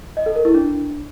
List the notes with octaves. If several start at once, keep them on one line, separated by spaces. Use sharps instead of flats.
D#5
A4
A#4
E4
D4